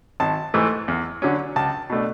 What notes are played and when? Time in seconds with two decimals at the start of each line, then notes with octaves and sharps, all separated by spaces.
0.20 G#1 A5
0.54 G#2 E3 A3
0.88 E2
1.22 D3 F#3 C#4
1.56 C#2 A5
1.90 B2 A3 D4